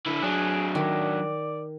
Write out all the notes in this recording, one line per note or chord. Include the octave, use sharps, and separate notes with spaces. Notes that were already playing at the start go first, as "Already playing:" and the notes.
D3 E4
F#3 D4 G#4
D#3 D5